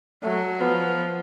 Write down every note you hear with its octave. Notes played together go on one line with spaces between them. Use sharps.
F#3 A3
F3 B3